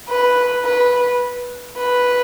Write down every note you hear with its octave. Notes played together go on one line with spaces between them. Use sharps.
B4
B4
B4